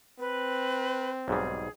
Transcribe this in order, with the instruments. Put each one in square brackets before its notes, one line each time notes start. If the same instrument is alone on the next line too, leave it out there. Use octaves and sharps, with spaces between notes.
[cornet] C4 [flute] B4
[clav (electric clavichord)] B1 G#2 G3 [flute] G#4